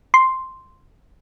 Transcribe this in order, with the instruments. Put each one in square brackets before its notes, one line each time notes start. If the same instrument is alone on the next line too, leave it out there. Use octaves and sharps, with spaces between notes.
[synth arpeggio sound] C6